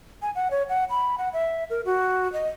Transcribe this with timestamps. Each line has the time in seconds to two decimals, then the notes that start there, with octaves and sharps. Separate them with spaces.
0.22 G#5
0.35 F#5
0.51 C#5
0.69 F#5
0.90 B5
1.18 F#5
1.33 E5
1.70 A#4
1.86 F#4
2.33 D#5